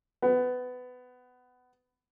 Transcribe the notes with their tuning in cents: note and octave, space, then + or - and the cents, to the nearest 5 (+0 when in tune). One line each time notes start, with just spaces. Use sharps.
B3 +20